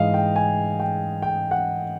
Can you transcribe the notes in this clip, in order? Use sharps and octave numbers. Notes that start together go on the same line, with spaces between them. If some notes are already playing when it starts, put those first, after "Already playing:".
Already playing: G#2 E3 D#5 F5
G5
G#5
G5
G5
F#5